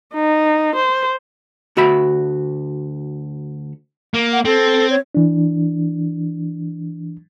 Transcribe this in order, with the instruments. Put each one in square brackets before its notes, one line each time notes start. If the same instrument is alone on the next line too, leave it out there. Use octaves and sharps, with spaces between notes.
[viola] D#4
C5
[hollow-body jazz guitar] D2 F#4 E5 B5
[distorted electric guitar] A#3
[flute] F#5
[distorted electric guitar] C4 [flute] A4
[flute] C#5
[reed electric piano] E3 D4